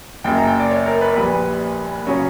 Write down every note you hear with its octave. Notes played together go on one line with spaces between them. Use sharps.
F#1 F#2 C#3 G5
A#5
G5
D5
C#5
A#4
B4
A#1 A#2 G3 B4
C#3 F#3 C#4